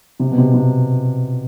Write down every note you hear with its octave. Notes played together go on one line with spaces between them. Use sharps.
C3
B2
C3
C3